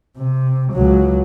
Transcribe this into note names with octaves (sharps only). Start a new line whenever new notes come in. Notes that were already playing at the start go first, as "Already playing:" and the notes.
C3
C#2 F#3